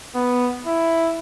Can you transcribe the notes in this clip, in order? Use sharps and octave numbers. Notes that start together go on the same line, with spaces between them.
B3
E4